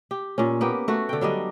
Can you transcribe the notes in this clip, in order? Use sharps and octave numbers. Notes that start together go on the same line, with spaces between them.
G4
A#2 C#4
A#3 B3 G4
A3 F#4
D3 G5
F#3 G3 D4 D#5